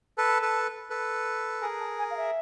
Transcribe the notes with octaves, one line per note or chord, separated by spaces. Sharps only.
A4 B4 A5
A4 B4
A4 B4
G#4 A#4 G#5
A5
G#5
F5
E5